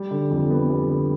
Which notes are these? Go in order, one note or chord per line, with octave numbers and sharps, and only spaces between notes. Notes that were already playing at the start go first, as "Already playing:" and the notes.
Already playing: G3
D3
F2
B3
G3
D3